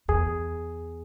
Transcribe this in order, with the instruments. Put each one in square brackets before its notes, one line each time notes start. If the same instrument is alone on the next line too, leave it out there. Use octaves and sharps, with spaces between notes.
[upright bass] E2 [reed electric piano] G#4